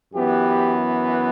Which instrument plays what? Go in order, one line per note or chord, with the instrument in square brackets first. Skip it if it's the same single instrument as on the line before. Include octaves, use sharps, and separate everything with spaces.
[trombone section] F#2 E3 B3 G4